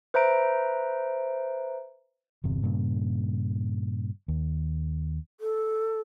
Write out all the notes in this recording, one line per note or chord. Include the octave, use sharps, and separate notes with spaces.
B4 C5 E5 A#5 D7
G1 E2 C3
G2 A#2 C#3
D#2
A4